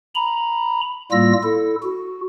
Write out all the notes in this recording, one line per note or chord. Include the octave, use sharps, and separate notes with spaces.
A#5 B5
A2 G3 A#3 F4 E6 A#6
E4 A4
F#4